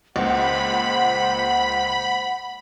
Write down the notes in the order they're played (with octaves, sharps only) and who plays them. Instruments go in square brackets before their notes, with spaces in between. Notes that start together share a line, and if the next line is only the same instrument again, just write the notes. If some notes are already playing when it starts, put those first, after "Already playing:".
[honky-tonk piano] C#2 A#2 [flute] C5 [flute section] F#5 [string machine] B5